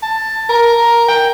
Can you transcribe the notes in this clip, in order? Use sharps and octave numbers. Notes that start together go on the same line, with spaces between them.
A5
A#4
G5